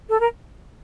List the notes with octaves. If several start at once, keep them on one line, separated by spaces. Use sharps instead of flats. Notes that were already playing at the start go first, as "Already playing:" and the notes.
A4
A#4